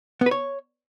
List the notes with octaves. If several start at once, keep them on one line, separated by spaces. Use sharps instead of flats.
B3
B4
C#5